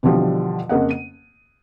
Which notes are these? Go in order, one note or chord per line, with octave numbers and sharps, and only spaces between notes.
B2 D3 E3 F3 G3
F2 C#3 A#3 D#5 F#5
D#7